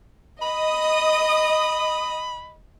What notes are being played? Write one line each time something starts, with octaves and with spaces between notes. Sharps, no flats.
D#5 B5 D#6